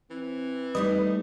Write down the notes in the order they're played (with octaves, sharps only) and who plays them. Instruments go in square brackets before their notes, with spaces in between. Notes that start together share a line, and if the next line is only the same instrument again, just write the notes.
[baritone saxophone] E3 [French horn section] C4
[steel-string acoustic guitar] G3 A3 D#4 [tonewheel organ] B4 D#5